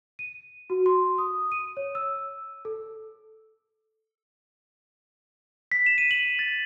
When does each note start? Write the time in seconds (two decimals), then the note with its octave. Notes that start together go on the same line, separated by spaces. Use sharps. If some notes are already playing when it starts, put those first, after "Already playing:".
0.19 D#7
0.70 F#4
0.86 C6
1.18 D#6
1.52 D#7
1.77 C#5
1.95 E6
2.65 A4
5.72 B6
5.86 E7
5.98 D#7
6.11 F#7
6.39 A6